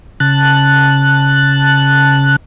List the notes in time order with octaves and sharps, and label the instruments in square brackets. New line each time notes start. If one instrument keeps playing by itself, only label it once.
[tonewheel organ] C#3 A5 F#6